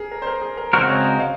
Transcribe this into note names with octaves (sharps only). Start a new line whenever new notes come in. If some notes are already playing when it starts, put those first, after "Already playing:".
Already playing: G#4 A#4
A#4
C5
A#4
G#4
A#4
C#3 G#3 C4 F#4 A#4 C5
C#5
D#5
F5